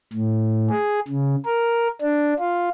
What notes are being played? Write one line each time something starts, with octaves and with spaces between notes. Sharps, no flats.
A2
G#4
C#3
A#4
D4
F4